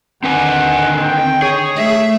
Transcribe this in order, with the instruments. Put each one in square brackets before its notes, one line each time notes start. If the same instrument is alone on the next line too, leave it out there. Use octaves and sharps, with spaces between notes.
[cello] D3 D#3 [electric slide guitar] C4 B4 G#5 [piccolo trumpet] F#5
[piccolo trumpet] G5
[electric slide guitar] G#4 [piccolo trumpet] C#5
[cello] A3 E5